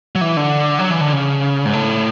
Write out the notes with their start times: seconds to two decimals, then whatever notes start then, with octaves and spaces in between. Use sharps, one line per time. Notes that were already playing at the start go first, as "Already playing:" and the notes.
0.15 F#3
0.21 E3
0.37 D3
0.79 F#3
0.91 E3
1.01 D3
1.13 C#3
1.65 G#2
1.73 A2